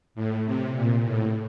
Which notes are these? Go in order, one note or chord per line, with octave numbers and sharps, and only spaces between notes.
A2
C3
A#2
A2